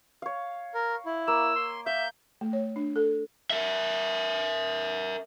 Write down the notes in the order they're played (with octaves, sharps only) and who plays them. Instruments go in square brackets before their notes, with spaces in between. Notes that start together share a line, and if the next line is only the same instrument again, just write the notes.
[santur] C#5 F5
[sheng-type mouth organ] A#4
E4
[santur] A#3 [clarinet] E6
[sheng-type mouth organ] C6
[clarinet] E5 [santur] F5 [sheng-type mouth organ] G6
[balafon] A3
C#5
D4
A4
[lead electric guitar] A#4 E5